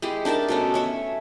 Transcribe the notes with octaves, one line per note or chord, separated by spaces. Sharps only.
G#3 E4 G4 G#4
D4 D#4 A#4 A5
B2 A3 C#4
C#4 C#5 E5